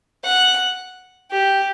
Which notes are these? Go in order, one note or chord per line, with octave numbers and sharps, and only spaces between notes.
F#5
G4